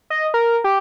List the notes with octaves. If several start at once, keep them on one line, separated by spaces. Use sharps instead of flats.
D#5
A#4
G4